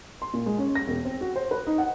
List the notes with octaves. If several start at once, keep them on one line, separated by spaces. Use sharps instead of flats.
C6
A#2
G#3
C#4
A#6
E1
C4
F#4
C5
B4
D#4
F#5